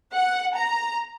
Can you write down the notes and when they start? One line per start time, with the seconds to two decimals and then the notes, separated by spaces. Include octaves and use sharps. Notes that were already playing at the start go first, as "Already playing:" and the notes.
0.12 F#5
0.56 A#5